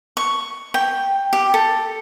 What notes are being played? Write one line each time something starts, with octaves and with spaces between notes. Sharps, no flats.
C#6
G5
G4
A4